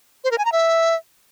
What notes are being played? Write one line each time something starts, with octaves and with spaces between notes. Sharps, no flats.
C5
A#4
G#5
A#5
E5